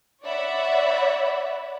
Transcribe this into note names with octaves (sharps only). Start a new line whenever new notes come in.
C#5 D5 E5 F#5 B5